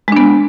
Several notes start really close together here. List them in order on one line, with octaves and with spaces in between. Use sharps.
G#3 D4 B3